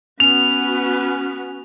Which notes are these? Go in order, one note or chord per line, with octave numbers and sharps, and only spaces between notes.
B3 C#4 F#4 F7